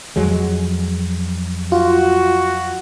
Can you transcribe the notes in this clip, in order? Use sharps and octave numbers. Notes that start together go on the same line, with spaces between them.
F2 F#3 G#3
F4 F#4